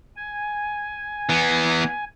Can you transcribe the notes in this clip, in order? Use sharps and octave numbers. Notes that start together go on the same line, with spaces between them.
G#5
E3 B3